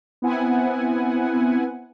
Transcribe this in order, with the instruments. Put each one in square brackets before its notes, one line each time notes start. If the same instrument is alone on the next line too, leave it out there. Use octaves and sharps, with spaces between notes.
[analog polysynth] B3 C4 E4 F#5 G#5